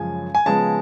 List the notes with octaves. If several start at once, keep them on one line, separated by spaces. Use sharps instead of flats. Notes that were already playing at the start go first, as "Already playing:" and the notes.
Already playing: F#2 C#3 F3 G#3 G#5
G#5
C#3 F3 G#3 B3 A5